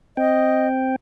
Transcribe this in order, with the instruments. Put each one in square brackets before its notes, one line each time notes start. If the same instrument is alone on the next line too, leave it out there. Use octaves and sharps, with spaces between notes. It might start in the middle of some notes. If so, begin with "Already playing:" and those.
[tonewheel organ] C4 G5 [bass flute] D#5